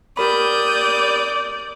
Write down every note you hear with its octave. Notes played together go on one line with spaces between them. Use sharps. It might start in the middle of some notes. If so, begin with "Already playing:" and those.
G4 A#4 D5 B5 D#6 G6